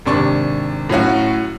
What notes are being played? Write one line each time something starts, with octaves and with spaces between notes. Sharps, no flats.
G#1 C3 D4 C#6
A2 F#3 C#4 F#4